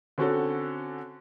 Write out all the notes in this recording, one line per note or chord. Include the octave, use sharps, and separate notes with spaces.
D3 C4 C#4 F#4 A4